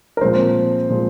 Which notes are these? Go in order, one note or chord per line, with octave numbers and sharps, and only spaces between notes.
A#4
A#2 F3 G#3 C4 C5
A#2 F3 G#3